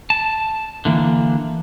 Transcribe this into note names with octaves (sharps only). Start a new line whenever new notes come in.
A5
D3 E3 A#3